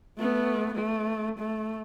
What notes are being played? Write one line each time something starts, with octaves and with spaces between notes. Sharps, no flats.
A3 B3
A3
A3